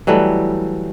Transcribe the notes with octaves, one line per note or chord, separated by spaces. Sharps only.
E3 F#3 G3 A3